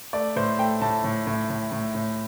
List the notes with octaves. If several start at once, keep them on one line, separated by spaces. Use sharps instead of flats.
A3 D5
A2 C5
A3 G5
A2 A5
A2
A2
A2
A2
A2